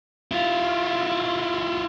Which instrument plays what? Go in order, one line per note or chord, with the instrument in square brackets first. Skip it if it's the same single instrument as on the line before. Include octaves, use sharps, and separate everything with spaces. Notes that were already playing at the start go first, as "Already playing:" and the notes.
[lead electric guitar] E4 F4